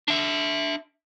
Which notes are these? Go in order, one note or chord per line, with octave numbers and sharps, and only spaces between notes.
D4 E5